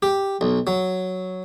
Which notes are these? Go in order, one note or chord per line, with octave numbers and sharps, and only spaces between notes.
G4
B1
F#3